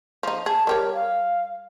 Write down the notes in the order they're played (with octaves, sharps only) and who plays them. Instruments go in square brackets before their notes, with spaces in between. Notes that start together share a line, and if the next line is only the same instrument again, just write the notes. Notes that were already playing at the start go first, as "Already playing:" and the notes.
[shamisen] F3 D#4
[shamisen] G#4 [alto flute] A5
[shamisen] G3 G4 C#5 [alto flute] A#4
[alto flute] F5